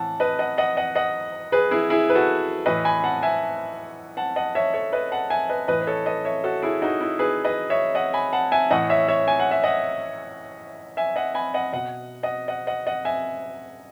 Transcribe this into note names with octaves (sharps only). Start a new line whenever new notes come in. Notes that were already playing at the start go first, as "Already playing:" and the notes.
Already playing: A2 E3 F#5 A5
B4 D#5
D#5 F#5
D#5 F#5
D#5 F#5
D#5 F#5
G#4 B4
E4 G#4
E4 G#4
B4
F#4 A4
A2 E3 B4 D#5
G#5 B5
F#5 A5
E5 G#5
F#5 A5
D#5 F#5
C#5 E5
A4 C#5
B4 D#5
F#5 A5
E5 G#5
B4 D#5
A2 E3 B4 D#5
B4
A4 C#5
B4 D#5
C#5 E5
F#4 A4
E4 G#4
D#4 F#4
E4
G#4 B4
B4 D#5
C#5 E5
D#5 F#5
G#5 B5
F#5 A5
E5 G#5
A2 E3 D#5 F#5
C#5 E5
C#5 E5
G#5
F#5
E5
D#5 F#5
E5 G#5
D#5 F#5
G#5 B5
D#5 F#5
B2 D#5 F#5
D#5 F#5
D#5 F#5
D#5 F#5
D#5 F#5
E5 G#5